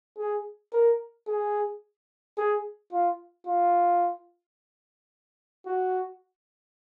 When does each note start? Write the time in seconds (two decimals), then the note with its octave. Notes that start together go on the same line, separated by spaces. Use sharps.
0.18 G#4
0.73 A#4
1.27 G#4
2.37 G#4
2.92 F4
3.47 F4
5.66 F#4